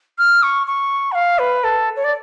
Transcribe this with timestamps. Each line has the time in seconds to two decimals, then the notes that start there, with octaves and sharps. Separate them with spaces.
0.18 F6
0.42 C#6
0.67 C#6
1.12 F#5
1.15 F5
1.39 B4
1.64 A4
1.96 C#5
2.04 D5